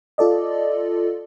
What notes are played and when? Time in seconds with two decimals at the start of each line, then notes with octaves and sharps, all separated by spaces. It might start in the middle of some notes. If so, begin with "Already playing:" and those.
0.18 F4 A4 D5 D#5